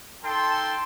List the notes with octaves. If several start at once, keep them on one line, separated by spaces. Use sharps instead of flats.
D#4 A4 G5 A5 C6